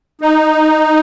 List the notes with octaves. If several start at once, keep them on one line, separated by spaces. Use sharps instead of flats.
D#4